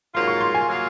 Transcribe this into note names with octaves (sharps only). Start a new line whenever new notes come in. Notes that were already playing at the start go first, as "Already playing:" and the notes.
G#2 F#3 A#3 F4 C6
C#6
C6
G#5
F#3 A#3 F4